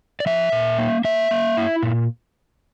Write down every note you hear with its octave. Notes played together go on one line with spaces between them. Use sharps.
D5
F3 E5
A#2
A#3
A#3 E5
A#3
E4
A#2